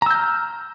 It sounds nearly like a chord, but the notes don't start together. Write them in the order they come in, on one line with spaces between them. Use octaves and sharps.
A#5 E6 G6 F6